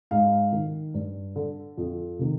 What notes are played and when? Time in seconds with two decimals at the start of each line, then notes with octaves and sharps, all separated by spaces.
0.11 G#2 F5
0.52 D#3
0.94 G2
1.36 D3
1.78 F2
2.19 C3 D#3